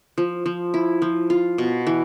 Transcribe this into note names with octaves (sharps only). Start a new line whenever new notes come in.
F3
F3
E4
F3
F4
B2
E3